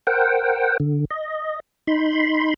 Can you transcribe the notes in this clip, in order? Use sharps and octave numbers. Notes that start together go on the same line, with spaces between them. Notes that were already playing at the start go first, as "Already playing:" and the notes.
A#4 C5 F#5 G5
D3
D#5
D#4 B5 C6